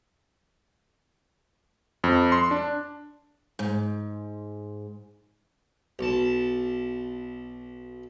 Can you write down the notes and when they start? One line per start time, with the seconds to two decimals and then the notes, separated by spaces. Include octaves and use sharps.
2.04 F2
2.32 C6
2.51 D4
3.59 G#2
5.99 B1 A5